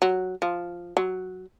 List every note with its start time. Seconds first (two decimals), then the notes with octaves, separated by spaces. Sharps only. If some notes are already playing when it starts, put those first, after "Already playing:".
0.02 F#3
0.42 F3
0.97 F#3